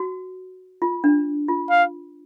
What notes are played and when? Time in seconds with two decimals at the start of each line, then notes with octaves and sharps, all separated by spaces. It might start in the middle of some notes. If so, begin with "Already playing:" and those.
Already playing: F#4
0.82 F4
1.04 D4
1.48 F4
1.70 F5